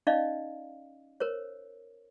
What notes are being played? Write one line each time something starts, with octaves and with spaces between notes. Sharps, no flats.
C#4 D#4 D5 D#5 F5
A#4 C5 C#5